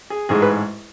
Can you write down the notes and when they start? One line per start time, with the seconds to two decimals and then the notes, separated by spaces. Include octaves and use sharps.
0.10 G#4
0.29 A1 G#2 G#3 G#4
0.42 B4